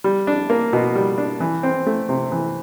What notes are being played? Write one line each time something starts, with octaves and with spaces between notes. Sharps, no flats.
G3
D4
A#3
B2
G3
D4
E3
C4
A3
C3
E3